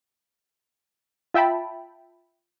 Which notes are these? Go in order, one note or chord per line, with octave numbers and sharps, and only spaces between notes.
F4 E5 G5 A5 B5